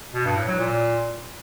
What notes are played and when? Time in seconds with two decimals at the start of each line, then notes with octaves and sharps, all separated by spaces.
0.14 B2
0.25 G2
0.37 A2
0.48 F#3
0.59 A#2